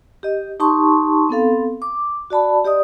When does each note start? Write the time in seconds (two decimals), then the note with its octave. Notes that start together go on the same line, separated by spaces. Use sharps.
0.23 G4 D#5
0.60 D#4 G4 A5 C6 C#6
1.29 B3 C4 A4 F5
1.82 D6
2.30 F#4 D5 A5 B5
2.65 G4 D5 D#5 D#6